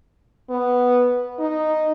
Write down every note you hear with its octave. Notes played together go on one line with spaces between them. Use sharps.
B3
D#4